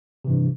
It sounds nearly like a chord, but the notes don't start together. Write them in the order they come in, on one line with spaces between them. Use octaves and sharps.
C3 E3 G2